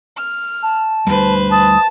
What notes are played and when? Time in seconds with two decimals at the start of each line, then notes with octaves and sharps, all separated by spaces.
0.17 F6
0.63 A5
1.07 D2 G3 B4 C5
1.52 A5 D#6